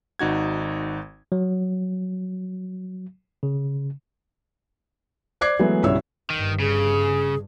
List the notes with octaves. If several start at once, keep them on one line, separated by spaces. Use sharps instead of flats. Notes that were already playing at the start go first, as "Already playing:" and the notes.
G#1 D#4 F#4 G#6
F#3
C#3
C5 D5 D6 F#6 G#6 C7
E3 F#3 G#3 A3 B3
B1 G2 C#3 E4 C#5 E6
G1 G2 D#3
C#3 G#4